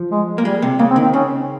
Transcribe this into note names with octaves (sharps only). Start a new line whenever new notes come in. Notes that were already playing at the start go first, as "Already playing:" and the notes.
Already playing: F3
G#3
A#3
G3 G#3
C3
C#3 A#3
C4
D#3
C4
C#3 C#4